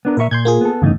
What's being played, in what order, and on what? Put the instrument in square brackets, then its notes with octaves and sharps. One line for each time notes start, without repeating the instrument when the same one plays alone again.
[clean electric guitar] B3 D4 A#4
[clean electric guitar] A#2 E4 E5 [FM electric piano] A#4 C#6
[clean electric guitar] A#2 [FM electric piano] C6 G6 G#6
[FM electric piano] A#3 F4 G#4
[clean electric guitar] B3 A4
[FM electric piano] G1 E2 A2 [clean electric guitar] C#3 D#4